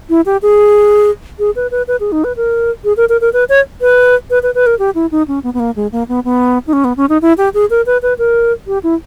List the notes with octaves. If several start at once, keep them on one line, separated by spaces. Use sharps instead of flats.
E4
G4
G#4
G#4
B4
B4
B4
G#4
D#4
B4
A#4
G#4
A#4
A#4
A#4
B4
C#5
B4
B4
B4
B4
A#4
G4
E4
D#4
C#4
B3
B3
A#3
G#3
A#3
B3
B3
D#4
C#4
B3
C#4
D#4
E4
G4
G#4
A#4
B4
B4
A#4
G4
E4